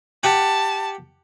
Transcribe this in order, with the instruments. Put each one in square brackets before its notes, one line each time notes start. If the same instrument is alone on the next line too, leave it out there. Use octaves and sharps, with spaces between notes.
[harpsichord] G4 F#5 [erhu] A5